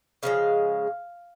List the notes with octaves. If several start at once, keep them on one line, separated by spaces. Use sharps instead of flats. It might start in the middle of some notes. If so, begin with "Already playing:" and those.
C#3 F3 G#3 F5